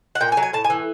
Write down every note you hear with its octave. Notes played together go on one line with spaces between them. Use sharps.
F#5
A#2 G5
G#5
F#3
G#5
A2 A5
G#5
E3